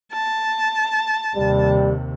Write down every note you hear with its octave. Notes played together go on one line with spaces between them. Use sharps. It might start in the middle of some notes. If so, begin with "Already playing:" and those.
A5
D#2 C3 G3